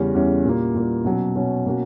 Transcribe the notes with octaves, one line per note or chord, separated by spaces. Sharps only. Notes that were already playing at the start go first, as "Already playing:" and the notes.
Already playing: E2 C#3 G3 C#4
E2 C#3 G3 C#4
A#2 G3 A#3
A#2 G3 A#3
B2 F#3 C#4
B2 F#3 C#4
B2 A#3 C#4 F#4